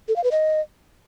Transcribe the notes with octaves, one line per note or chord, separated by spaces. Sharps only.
A4
F5
B4
D#5